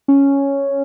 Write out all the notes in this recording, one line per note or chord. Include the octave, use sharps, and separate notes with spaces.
C#4